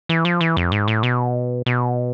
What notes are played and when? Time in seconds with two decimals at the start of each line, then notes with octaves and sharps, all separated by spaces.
0.09 E3
0.25 F3
0.41 E3
0.57 F2
0.72 G#2
0.88 A2
1.03 B2
1.66 B2